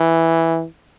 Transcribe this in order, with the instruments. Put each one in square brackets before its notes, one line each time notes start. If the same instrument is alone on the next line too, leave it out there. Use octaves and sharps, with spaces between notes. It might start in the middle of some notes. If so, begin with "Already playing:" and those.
Already playing: [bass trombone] E3